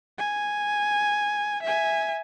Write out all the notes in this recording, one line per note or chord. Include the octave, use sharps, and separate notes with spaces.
G#5
E5 G#5